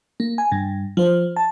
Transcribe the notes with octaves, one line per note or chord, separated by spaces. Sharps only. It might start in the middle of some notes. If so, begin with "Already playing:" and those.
A#3
G#5
G2
F3 C5
A5